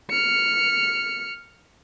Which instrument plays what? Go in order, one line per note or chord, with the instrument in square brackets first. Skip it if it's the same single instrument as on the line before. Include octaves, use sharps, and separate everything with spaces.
[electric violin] F6 C#7